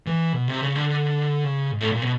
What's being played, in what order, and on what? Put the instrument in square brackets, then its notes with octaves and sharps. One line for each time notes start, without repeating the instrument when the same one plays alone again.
[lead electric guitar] E3
B2
C3
C#3
D3
C#3
G#2
A2
A#2
B2